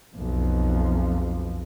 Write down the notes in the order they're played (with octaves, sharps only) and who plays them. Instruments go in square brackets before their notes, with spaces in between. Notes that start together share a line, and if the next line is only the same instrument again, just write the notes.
[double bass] B1 F2